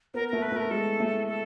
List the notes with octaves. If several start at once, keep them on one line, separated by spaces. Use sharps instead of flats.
B3 A#4
A3 A#4
B4
A3 A#4
G#3 A4
A3
A4